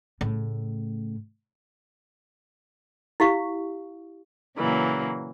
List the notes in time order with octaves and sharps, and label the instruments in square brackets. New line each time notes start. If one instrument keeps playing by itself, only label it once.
[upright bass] A2 C#3
[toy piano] E4 G4 F5 C#6
[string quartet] A#2 C#3 E3 F#3 A#3